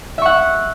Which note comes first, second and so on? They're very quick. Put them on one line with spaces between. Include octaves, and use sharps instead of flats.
E5 C#6 F#5